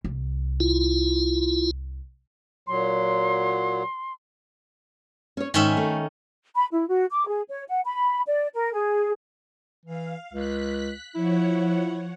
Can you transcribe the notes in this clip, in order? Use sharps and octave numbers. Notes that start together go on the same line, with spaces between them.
C2
E4 F4
A#2 F#3 C6
C#4 C#5
G#2 D#3 C#4 E5
A3
B5
E4
F#4
D6
G#4
C#5
F#5
B5
D5
A#4
G#4
E3 F5
C#2 F#6 B6
F3 E4 C#5 F#5